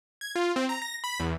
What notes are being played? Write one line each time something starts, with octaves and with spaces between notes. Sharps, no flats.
G#6
F4
C4
A#5
A#6
B5
E2